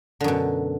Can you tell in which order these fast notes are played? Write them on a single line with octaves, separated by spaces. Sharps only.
D3 F#2 B2